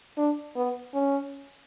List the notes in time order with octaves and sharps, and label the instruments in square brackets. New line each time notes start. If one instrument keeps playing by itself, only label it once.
[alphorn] D4
B3
C#4